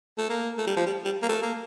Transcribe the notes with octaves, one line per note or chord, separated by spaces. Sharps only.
A3
A#3
A3
G3
F3
G3
G3
A#3
A3
A#3